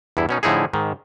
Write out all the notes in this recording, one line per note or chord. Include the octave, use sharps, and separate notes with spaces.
E2 G2 E4
B2 C#4 D#4
A2 D3 F3 D#4 E4 G#4
G#2 D#3